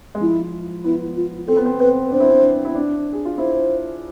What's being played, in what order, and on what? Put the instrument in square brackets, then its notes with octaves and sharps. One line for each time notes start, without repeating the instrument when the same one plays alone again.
[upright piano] G#3
[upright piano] F3 [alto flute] E4
[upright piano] B3 [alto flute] E4
[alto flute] F4
[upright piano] C4 [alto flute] A4
[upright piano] B3
C4
[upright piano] C4 [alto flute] B4
[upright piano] D4 [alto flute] C5
[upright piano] E4
D4
E4
D4
G#4
F4
[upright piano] E4 [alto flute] C5